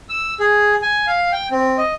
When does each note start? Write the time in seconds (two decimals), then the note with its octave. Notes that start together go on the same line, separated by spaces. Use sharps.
0.09 E6
0.40 G#4
0.82 G#5
1.07 F5
1.32 G5
1.51 C4
1.78 D#5